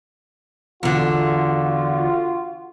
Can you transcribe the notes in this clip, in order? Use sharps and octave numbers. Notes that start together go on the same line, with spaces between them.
E2 D3 F4 F#4